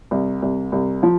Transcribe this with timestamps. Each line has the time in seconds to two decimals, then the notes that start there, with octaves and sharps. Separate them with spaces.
0.11 C2
0.42 C2
0.72 C2
1.03 F3